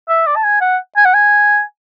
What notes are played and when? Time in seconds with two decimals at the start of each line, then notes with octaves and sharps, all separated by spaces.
0.09 E5
0.26 D5
0.36 A5
0.44 G#5
0.61 F#5
0.97 G#5
1.05 F#5
1.14 G#5